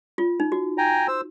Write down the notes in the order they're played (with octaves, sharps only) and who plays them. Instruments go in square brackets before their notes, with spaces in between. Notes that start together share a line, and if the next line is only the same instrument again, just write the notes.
[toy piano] F4
D#4
F#4
[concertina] G5 G#5 A#5
C5 E6